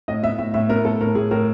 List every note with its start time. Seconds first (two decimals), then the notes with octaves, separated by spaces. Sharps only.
0.08 A2 D#5
0.23 B3 E5
0.39 A2 E5
0.54 A2 E5
0.69 B3 A#4
0.85 A2 A4
1.01 A2 A#4
1.15 A2 G#4
1.31 A2 A#4